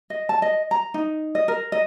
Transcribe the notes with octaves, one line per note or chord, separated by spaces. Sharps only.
D#5
A5
D#5
A#5
D#4
D#5
A#4
D#5